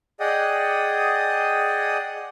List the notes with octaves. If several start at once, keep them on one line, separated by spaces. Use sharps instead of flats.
G#4 D5 D#5 F#5 G5 D#6